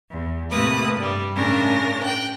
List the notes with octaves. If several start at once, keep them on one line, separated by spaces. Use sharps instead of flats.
E2
A2 C3 A3 A#3 B4 D#6
G2 G3
A2 C#3 C#4 D4 A#4 A#6
G5 F#6